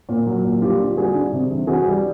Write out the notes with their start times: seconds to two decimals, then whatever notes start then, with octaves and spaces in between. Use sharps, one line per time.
0.09 A#2
0.26 F#3
0.44 A#2
0.62 G3 F4 G4
0.79 D3
0.97 G3 F#4 G#4
1.15 D3
1.32 C3
1.51 E3
1.67 E3 F#4 G#4
1.86 G3